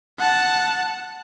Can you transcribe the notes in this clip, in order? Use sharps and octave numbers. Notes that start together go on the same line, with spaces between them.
F#5 A5